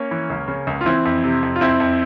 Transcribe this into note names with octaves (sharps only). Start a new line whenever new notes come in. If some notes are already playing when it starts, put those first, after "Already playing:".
Already playing: A#3 C#4
E3
C#2
C#3
C#2
F4
E3 C4 E4
F2
C3
F2
F4
F2 C4 E4
F2